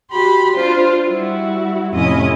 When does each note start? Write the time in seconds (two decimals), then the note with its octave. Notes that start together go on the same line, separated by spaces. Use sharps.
0.11 F#4 G4 B5 C6
0.53 D4 F4 C5
1.07 G3 E4 F#4
1.92 F2 A2 C3 C#4 E4 D#5